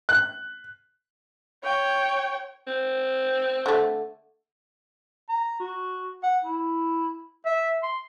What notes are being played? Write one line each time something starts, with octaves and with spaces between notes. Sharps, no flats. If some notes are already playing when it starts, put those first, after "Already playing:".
F#6
C#5 G5
C4
D3 A3
A#5
F#4
F#5
E4
E5
C6